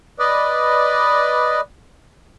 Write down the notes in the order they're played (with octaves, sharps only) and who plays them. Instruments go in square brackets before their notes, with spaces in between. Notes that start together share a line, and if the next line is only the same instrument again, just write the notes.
[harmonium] B4 D5 D#5